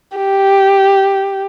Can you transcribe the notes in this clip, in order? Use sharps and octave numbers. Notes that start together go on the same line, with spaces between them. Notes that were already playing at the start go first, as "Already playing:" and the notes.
G4